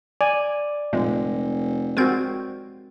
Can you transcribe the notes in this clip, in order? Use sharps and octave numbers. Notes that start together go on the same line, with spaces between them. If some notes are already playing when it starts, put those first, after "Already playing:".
D5 G#5
F1 A#2 G#3
G#3 C4 F#4 A#4 G6